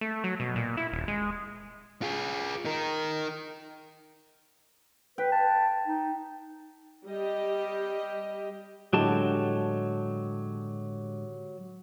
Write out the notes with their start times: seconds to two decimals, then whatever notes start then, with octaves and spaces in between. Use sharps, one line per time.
0.01 A3
0.24 F#3
0.40 B2
0.56 A#2
0.77 E4
0.92 D#1
1.08 G#3
2.02 F4 G#4
2.65 D#4 A#4
5.18 B4 G5
5.32 A5
5.87 D#4
7.06 G3 G4 D#5
8.93 A2 D3 F#3 G#3 G4 A5